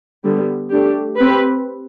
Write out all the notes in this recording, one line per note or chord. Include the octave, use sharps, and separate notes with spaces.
D3 G3 B3
A3 D4 G4
C4 G4 B4